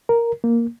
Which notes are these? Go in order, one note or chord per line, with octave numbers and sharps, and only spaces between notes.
A#4
A#3